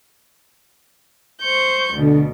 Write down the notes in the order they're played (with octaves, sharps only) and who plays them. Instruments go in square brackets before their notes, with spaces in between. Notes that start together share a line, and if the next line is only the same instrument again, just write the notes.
[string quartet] C5 C#6 G6
[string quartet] D2 B2 [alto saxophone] D3